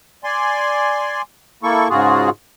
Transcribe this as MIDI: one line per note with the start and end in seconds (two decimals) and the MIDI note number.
0.24 1.22 74
0.24 1.22 80
0.24 1.22 84
1.63 1.88 58
1.63 1.88 64
1.63 1.88 69
1.63 1.88 85
1.90 2.30 44
1.90 2.30 49
1.90 2.30 65
1.90 2.30 66
1.90 2.30 68